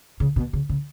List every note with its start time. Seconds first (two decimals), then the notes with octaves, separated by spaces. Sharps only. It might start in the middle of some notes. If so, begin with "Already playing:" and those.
0.20 C#3
0.36 B2
0.53 C#3
0.69 C#3